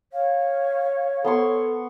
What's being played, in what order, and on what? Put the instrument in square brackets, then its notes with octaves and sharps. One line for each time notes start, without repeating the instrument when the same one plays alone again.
[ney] C#5 [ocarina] F5
[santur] B3 C6 C#6 [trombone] A4